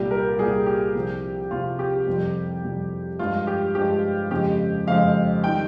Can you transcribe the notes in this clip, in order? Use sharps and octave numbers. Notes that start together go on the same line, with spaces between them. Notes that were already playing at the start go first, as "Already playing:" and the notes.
Already playing: C2 A#2 G3 G4
A#4
C2 A#2 G3 G#4
G4
C2 C3 F3
C2 C3 F3 F4
G4
F2 C3 G3
F2 C3 G3
G2 F3 G#3 F4
G4
G2 F3 G#3 G4
F2 C#3 G#3 G4
F2 C#3 G#3 F5
D#3 G3 G5